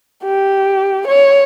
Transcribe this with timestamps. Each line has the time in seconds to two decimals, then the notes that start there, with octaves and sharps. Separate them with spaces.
0.24 G4
1.07 C#5